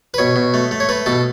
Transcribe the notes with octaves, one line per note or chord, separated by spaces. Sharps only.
B4
B2 C#5
B2
A3
A3
C#5
A3 B4
B2 A4